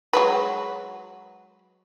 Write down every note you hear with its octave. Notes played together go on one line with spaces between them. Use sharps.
F#3 G#3 B4